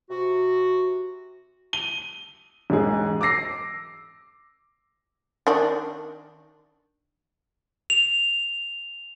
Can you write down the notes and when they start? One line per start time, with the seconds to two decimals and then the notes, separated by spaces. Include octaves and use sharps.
0.10 C3 F#4
1.73 D#7 G7
2.70 E1 G#2 G#4
3.21 D6 E6 A#6 C7
5.47 D#3 D4
7.90 F7